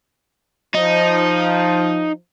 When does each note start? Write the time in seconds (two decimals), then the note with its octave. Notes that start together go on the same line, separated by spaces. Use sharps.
0.75 F3 D#4